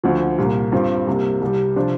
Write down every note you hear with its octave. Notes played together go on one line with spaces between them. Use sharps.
D2 D3 F3
C2 A#2 A#3
G2 G3 C4 F4
C2 C3 A#3
C2 C3 G3
C3 F3 D4 F4